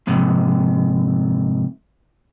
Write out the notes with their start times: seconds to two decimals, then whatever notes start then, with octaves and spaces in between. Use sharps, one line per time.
0.07 F2 G#2 C3